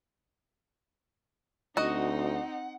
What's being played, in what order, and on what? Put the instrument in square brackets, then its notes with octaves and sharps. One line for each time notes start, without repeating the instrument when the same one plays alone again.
[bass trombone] D2 [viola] C4 D#4 [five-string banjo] F#4 D#5 [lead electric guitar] F#5